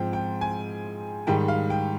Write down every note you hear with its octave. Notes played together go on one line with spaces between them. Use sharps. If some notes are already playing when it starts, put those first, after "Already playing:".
Already playing: G#2 F3 C4 G5
G5
G#5
G#2 D#3 G3 G5
F5
G5